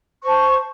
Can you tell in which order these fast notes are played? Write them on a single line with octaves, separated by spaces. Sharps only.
C#6 C5 A5